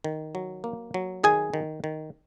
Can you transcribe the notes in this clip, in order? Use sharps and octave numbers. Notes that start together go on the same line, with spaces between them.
D#3
F#3
A#3
F#3
D#3 G#4 G#5
D#3
D#3